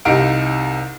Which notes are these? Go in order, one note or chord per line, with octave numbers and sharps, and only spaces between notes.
C2 C3 D#4 F5 D7